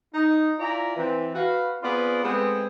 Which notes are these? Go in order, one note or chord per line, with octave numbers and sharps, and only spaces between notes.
D#4
E4 F4 D5 G#5 A#5
E3 C4
F#4 B4 F5
B3 C4 F4 G#4 D5 B5
G#3 A3 B3 C4